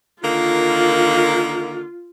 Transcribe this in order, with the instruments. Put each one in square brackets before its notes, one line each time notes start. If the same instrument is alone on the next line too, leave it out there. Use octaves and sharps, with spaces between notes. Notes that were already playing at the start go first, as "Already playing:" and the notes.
[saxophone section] D3 D#3 A#3 [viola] F4